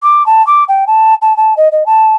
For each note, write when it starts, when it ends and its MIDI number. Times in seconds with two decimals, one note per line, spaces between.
0.03 0.26 86
0.26 0.45 81
0.47 0.64 86
0.68 0.85 79
0.87 1.14 81
1.22 1.36 81
1.37 1.54 81
1.57 1.68 75
1.72 1.86 75
1.86 2.16 81